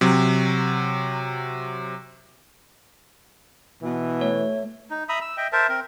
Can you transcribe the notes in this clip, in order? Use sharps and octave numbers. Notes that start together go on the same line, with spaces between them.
C3 F#3
B2 E3
A3 C#5
D#4
E5 A#5 B5 D#6
E6
D#5 E5 G5
A#4 C5 E5 A5
C4 A#4